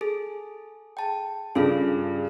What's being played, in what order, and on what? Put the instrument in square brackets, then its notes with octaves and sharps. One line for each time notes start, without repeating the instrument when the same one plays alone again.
[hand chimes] G#4 A4
G5 A5
[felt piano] G2 C#3 [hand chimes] F4 G#4 A4